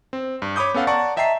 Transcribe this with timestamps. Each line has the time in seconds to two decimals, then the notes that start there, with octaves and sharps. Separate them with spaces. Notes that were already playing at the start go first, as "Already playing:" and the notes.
0.13 C4
0.42 G2
0.56 C#5 B5 D6 D#6 G6
0.74 B3 C#4 A4 F5 F#5
0.87 D5 F#5 A5 A#5 C#6
1.17 D#5 E5 G5 A5 A#5 C7